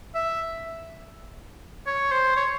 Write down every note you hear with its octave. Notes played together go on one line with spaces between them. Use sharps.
E5
C#5
C5
C#5